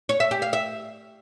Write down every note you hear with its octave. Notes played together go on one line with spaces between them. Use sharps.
C#5
E5
G4
F5
E5